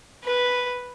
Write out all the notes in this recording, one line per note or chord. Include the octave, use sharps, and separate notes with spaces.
B4